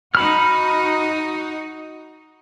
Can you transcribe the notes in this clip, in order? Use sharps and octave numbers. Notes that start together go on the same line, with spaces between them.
D#4 F#4 B5 F6